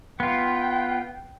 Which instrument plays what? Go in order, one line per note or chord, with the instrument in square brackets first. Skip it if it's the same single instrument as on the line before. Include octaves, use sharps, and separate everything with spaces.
[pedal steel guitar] B3 F4 [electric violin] G5